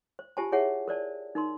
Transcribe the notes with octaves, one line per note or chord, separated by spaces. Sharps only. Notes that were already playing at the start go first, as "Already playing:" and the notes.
C5
F4 G4 C5 G#5 A5
E4 G#4 C#5 E5 F#5 A5
A#4 C5 D5 A5
D#4 A#4 C6